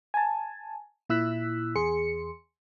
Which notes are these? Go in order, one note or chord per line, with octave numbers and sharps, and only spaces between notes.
G#5 A5
A#2 E4 E6 F#6 B6
E2 G#4 C6 C#7